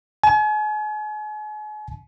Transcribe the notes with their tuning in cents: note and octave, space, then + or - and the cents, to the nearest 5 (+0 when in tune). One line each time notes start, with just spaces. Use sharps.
G#5 +40